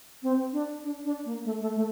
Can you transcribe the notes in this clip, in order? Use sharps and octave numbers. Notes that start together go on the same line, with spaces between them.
C4
D4
D4
D4
A#3
A3
A3
A3